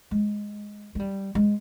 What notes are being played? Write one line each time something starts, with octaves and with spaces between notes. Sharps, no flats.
G#3
G#3
G3
G#3